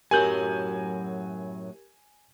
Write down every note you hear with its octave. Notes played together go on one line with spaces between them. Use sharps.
F#2 A2 F#3 G4 A#4 G#5 G6 F#7